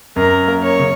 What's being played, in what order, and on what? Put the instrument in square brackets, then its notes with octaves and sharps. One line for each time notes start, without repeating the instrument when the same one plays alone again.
[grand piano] F#2 [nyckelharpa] A#4
[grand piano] A#3
[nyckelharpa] C#5
[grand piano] C#3